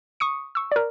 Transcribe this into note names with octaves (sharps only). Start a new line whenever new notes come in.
C#6 D#6 C#7
C#6 E6
A#4 D5